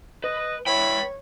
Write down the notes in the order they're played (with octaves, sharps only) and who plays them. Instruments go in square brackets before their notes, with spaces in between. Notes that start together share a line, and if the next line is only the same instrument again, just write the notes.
[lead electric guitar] B4 [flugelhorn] D#5
[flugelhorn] E4 [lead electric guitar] B4 G5 [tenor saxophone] C#5 [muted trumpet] B5